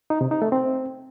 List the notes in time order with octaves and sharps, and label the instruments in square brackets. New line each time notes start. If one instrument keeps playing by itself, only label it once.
[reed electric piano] D#4
C3
D#4
A3
C4